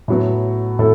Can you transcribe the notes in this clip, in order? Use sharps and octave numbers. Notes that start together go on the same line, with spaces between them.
A2 F#3 B3
A2 A4